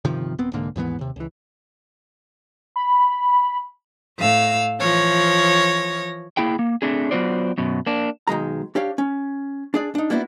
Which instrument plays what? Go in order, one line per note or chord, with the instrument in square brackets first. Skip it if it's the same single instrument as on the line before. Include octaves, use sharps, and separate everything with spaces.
[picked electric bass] G1 C3 D#3 F3
D#1 B3 C4
C2 G#2 D3 A#3
D#2 G#2 E3 B3
D#2 C3
C#2 E3
[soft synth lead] B5
[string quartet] A2 F5 E6
E3 F3 C#5 A#6
[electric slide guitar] A#3 E4 G#4 G5
A#3
A3 C4 D4 G#4
F#3 B3 F4 F#4 C5 D5
F#2 B2
A#3 D4
[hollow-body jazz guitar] B1 D#3 G#3 A#5
D4 G4 C#5 F5
C#4
D4 G#4 D5
D4 D#4
G3 A#3 B3 D4 E4 F#4